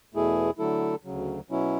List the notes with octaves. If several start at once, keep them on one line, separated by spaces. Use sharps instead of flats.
E2 B2 A3 E4 G#4
D3 F#3 A3 E4 A4
D2 C#3 F#3
B2 F#3 C#4 E4